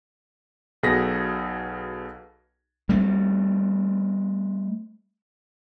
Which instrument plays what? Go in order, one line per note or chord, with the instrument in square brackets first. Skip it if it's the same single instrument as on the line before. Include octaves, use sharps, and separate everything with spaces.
[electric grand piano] B1 B2 G#4 A4 A#6 B6
[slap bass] G3 A3 C4